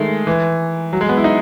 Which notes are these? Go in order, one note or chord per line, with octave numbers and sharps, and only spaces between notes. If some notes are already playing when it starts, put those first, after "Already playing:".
Already playing: D#3 G#3 A3
E3
F#3
G#3
B3
E4
D#4